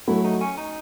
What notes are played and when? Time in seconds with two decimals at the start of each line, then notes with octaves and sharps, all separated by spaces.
0.08 F#3 A3 E4
0.24 D#4
0.41 C#4
0.58 D#4